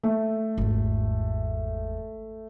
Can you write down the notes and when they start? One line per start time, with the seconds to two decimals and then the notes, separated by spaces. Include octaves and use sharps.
0.03 A3
0.58 G#1 E2